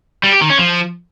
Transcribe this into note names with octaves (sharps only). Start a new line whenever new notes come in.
G3
G4
D#3
C#4
F3